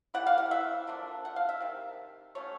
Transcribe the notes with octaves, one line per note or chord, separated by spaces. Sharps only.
E3 G3 A#3 F#5
F5
F#5
E5
D3 F3 A#3 D4
F#5
F5
E5
C3 D#3
F#3 A3 C#4 C#5